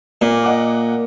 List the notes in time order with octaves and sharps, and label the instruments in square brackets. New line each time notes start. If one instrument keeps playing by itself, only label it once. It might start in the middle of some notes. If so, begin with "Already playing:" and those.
[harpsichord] A#2 [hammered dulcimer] A#3
[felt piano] D#5 F#5 D6